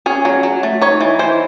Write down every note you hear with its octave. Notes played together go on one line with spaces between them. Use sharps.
C#4 G#4
F#3
F#3
A3
D#4 C#5
E3
E3 C5